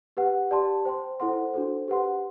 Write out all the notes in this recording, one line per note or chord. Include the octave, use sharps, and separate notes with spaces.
G4 B4 F#5
G4 D5 A5 C6
C5 G5 C6
E4 A4 C5 F#5 C6
D4 F#4 A4 C5
G4 B4 F#5 C6